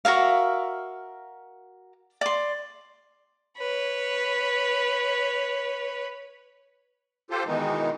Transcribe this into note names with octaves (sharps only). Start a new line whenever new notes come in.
F#4 A#4 E5 F5
D5 C6
B4 C#5
F4 G4 A4 C5
B2 D#3 E3 G#3 D#4